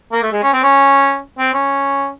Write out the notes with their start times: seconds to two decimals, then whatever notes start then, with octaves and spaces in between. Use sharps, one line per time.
0.13 A#3
0.22 A3
0.32 G#3
0.43 C#4
0.53 C4
0.63 C#4
1.38 C4
1.54 C#4